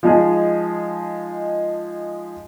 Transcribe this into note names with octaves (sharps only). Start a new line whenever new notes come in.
F3 G#3 D#4 G#4